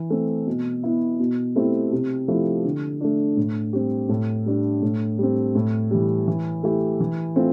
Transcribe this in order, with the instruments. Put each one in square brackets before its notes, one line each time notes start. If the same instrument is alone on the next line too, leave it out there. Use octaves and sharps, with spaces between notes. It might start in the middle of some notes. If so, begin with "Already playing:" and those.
Already playing: [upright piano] E3
A3 C4
B2
B3 E4
B2
A3 C4 E4 G4
C3
F3 A3 E4 G4
D3
A3 D4
A2
G3 C4 G4
A2
G3 D4
A2
G3 C4
A2
E3 G3
E3
A3 E4 G4
E3
A3 C4 F4